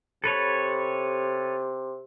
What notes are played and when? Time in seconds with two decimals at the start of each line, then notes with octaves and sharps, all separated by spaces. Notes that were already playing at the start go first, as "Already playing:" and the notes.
0.24 C3 A4 B4 C#5